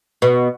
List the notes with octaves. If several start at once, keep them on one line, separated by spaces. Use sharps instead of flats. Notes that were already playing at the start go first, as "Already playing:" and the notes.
B2